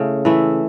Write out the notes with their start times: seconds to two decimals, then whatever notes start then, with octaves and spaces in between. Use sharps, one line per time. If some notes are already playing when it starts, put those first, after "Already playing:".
Already playing: C#3 A3 E4
0.25 E3 A3 E4